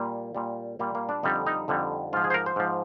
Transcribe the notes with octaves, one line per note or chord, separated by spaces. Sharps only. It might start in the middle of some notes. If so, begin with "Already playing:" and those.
Already playing: A#2 G3 A#3
A#2 G3
A#2 G3 A#3
A#3
D4
F2 D3 G3 D#4
D#4
F2 D3 G3
G#2 F3 F4
G#4
C5
A#4
C5
G#2 F3